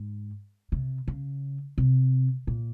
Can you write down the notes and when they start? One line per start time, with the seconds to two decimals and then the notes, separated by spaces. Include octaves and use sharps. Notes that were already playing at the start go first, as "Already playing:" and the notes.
Already playing: G#2
0.72 C3
1.08 C#3
1.78 C3
2.47 A#2